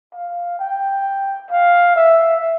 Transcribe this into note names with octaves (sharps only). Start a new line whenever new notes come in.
F5
G5
F5
E5